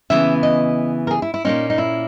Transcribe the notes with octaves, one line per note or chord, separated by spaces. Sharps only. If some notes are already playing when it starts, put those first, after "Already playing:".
C#3 E3 B3 E5
D#5
A#4
G#4
E4
E4
A#2 A#3 C#4 D#4
D#4
E4